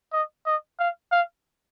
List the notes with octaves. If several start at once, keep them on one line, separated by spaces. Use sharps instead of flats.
D#5
D#5
F5
F5